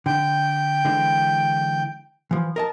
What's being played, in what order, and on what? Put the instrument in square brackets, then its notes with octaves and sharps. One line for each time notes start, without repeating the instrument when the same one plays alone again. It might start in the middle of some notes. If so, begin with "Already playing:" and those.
[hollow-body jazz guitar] D3 [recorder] G5
[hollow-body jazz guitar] D3 E3 G#3
E3 F3
A#4 D#5 A5